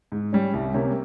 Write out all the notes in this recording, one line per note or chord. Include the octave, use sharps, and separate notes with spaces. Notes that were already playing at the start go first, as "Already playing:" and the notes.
G#2
G3 C#4
C2
C3 G3 A#3 C#4